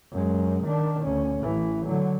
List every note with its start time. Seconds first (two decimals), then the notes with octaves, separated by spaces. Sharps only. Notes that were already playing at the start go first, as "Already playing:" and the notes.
0.12 F#2 G#3
0.65 D#3 D4
1.04 D2 C#4
1.39 A1 E3
1.86 D3 F#3